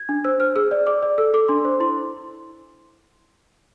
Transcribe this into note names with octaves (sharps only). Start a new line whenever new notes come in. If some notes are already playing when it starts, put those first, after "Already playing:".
Already playing: G#6
D4
C5 E6
C5 F6
G#4 E6
D5
D5 D6
D5
A4 E6
A4 D6
D4 C6
C5
E4 C6